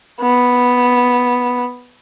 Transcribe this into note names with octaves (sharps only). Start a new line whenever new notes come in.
B3